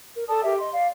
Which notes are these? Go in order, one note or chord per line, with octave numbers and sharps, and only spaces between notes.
A#4
A4 D5 A5 D#6
G4 A#4 E5
D#5 C6
D5 F5